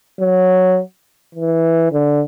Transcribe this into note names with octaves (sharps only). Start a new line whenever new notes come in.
F#3
E3
D3